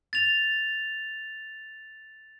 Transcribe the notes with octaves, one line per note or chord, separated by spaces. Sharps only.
A6 F7